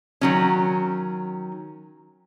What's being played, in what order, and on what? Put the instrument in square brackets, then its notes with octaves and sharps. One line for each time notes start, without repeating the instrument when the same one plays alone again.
[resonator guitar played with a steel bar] D#3 F#3 C#4